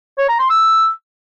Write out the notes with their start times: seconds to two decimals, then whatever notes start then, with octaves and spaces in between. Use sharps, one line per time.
0.18 C#5
0.29 A#5
0.39 C6
0.50 E6